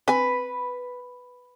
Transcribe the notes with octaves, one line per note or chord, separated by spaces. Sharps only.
C4 B4 G#5